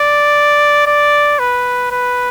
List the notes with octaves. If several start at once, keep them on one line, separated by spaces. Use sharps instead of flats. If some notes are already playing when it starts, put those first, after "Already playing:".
Already playing: D5
D5
B4
B4